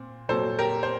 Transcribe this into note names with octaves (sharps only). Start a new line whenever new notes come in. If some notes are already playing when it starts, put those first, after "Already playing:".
Already playing: A#2 C4
A#2 F#3 C4 A4 C5
G4 A#4
C5